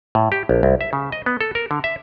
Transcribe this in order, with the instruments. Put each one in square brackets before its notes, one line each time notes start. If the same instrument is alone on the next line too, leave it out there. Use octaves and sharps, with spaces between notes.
[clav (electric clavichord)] A2
G4
A#1
C2
E5
C#3
D#5
B3
A4
A#4
D3
E5